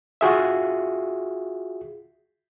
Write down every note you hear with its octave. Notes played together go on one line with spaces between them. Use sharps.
F4 F#4 G#4 E5